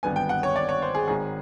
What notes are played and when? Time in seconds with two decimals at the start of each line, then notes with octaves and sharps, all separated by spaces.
0.03 G#1 G2 D3 G3 B3 G#5
0.16 G5
0.29 F#5
0.43 C#5
0.56 D5
0.69 C#5
0.82 C5
0.95 G#4
1.08 G#1 G#2 D#3 G#4